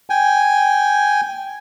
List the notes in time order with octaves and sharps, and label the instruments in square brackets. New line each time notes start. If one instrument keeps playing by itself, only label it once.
[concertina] G5 G#5